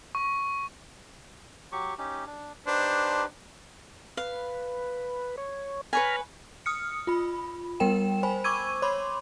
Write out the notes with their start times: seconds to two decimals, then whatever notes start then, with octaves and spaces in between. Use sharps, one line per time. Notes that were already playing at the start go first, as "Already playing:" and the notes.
0.15 C#6
1.72 F#3 G4 C#6
1.98 C#4 D#4 G4
2.27 D4
2.67 D4 D#4 G4 B4 C5
4.17 B4 F5
5.38 C#5
5.93 B4 C#5 G#5 A#5 B5 F6
6.66 D#6 F6 C#7
7.07 F4 B5
7.80 G3 B3 A#4 G5 E7
8.23 C5 G#5 B5
8.44 C#6 D6 E6 G#6 D#7
8.82 C#5 B5 C6 D6